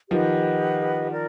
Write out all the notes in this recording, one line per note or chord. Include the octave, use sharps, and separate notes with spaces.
D#3 F3 G4 B4 D#5 F#5
A#4 D5